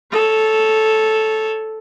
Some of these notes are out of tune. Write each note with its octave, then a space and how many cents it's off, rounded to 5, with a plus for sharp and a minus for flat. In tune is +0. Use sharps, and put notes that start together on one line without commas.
A4 -5 C#5 +0